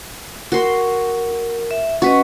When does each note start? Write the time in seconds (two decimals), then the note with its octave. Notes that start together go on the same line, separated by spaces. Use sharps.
0.52 F#4 A#4 C6
1.71 E5
2.02 C#4 F#4 B4 D#5